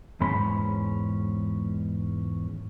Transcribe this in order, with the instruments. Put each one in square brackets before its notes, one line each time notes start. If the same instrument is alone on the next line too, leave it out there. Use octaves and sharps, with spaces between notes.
[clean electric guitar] E2 G#2 G#3 C#4 B5 C6